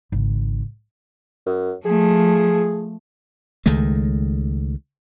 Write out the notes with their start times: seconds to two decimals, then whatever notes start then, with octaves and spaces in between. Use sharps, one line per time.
0.12 G#1 C#3
1.46 F#2
1.85 F3 A3 G#4
3.66 C#2 D#3 G#3 A3